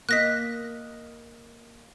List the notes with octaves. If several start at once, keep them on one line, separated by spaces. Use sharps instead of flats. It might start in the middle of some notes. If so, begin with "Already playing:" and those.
A#3 D#5 F#6 A#6 B6